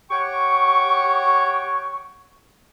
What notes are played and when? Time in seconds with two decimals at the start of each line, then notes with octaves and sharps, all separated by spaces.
0.11 G4 C#5 F#5 G5 C#6